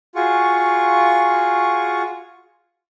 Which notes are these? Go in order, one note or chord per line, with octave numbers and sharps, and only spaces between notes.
F4 F#4 G#4 C#6